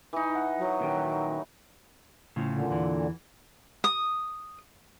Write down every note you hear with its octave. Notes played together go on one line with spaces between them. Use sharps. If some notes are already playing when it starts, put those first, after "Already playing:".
E3 D#4
F#5
F#3
A#2 D#3 G4
A2 C#3 F3
A#2 D3
E2 E3
D#6